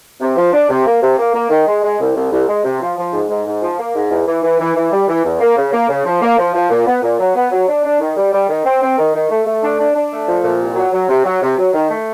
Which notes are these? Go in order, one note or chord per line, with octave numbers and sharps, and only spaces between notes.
C3
F3
D4
C3
A#3
C3
A#3
A#3
D#3
G#3
G#3
C2
C2
C2
G#3
C3
F3
F3
G#2
G#2
G#2
F3
A#3
G#2
E2
E3
E3
E3
E3
G3
E3
E2
A#3
C#3
A#3
C#3
F3
A#3
F3
F3
A#2
B3
A#2
F#3
B3
F#3
D4
D4
D#3
G3
G3
D#3
C4
C4
D#3
D#3
A3
A3
D4
D4
D4
A3
F3
A#2
C2
F#3
F#3
C3
F#3
C3
F#3
D#3
A3